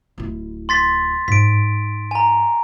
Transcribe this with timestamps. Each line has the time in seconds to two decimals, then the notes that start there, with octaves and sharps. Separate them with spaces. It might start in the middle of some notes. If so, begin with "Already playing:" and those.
0.18 D1 E4
0.69 C6 A6 B6
1.28 G#2 B6 D7
2.11 G#5 A#5